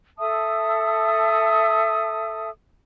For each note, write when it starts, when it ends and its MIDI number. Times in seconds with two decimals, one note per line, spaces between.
0.19 2.49 69
0.19 2.49 76
0.19 2.49 81
0.19 2.49 87